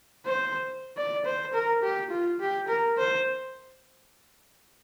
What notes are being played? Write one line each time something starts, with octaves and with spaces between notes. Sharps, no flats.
C5
D5
C5
A#4
G4
F4
G4
A#4
C5